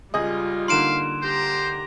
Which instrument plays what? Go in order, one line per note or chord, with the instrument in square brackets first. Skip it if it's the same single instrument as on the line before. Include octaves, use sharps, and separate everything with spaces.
[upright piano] C#2 G#4 D#5 [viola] G3 F4
[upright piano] D3 A#3 D#4 [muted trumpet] F5 [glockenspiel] C6 D7 E7
[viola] G4 A#5 [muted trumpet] C5